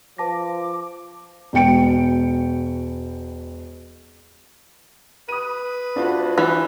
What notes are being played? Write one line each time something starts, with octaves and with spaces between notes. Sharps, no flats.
F3 B4 A5 D6 A#6
E1 B2 G5 C#7 D7
B4 D#6 D#7
D2 D4 F4 F#4
E3